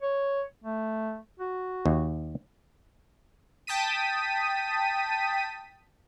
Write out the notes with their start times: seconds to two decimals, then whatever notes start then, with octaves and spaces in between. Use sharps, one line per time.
0.02 C#5
0.64 A3
1.39 F#4
1.86 D#2
3.67 G5 A5 D#6 B6 D#7